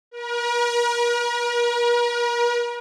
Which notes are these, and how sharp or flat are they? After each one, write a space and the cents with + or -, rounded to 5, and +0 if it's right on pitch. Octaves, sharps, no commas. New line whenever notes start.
A#4 +45